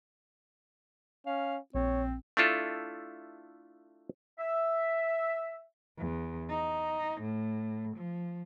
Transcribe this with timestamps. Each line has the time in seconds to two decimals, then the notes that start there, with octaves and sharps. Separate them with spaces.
1.27 C#4 F5
1.75 A#1 C4 C#5
2.37 A3 D4 E4 F4 A4
4.39 E5
5.98 E2
6.50 D#4
7.21 A2
7.97 F3